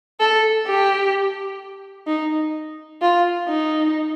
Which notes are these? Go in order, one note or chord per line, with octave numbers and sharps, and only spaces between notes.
A4
G4
D#4
F4
D#4